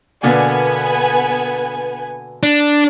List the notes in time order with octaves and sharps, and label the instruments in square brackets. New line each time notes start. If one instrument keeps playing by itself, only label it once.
[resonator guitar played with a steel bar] B2 D3 A#3 [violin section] B3 G#5
[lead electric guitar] D4